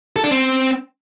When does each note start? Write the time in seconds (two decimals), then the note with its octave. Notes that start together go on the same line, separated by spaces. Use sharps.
0.16 A4
0.24 D4
0.31 C4